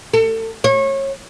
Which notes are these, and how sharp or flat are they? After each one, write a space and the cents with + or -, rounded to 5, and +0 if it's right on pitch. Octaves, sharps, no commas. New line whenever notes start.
A4 +35
C#5 -30